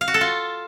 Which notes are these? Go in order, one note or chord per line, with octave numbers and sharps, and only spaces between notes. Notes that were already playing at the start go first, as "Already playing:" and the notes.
F5
F#4
A4
F4